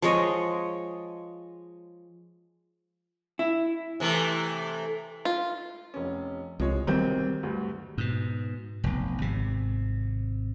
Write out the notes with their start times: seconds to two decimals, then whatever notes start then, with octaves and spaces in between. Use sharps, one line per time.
0.02 F3 G#3 C#5 D#5
3.39 E4
4.00 C3 E3 A3
5.25 F4
5.94 F1 C#4
6.60 C2 F3 G#3 C#5
6.87 B1 D#3 F#3 G3 C4 G6
7.43 D2 G2
7.98 G#2 B2
8.84 F1 B1
9.22 G#1 C3